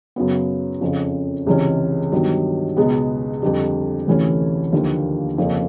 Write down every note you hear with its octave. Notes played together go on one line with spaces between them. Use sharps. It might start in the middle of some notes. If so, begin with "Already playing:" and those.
F#2 C#3 F#3 B3
F2 C#3 F3
C#2 C3 E3 G#3 C#4
G2 D#3 F#3 B3
C#2 B2 G#3 B3
F2 D3 G3
D2 C3 E3 A3 C#4
D#2 D3 F3 A#3
F2 C#3 F3 A#3 C#4